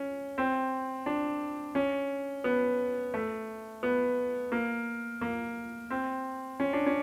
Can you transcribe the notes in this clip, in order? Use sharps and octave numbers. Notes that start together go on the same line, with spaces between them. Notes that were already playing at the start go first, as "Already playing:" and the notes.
Already playing: C#4
C4
D4
C#4
B3
A3
B3
A#3
A#3
C4
C#4
D4
C#4